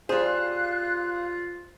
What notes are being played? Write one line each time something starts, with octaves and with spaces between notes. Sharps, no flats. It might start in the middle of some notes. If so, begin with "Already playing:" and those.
G3 F4 G#4 C5 F5 F#6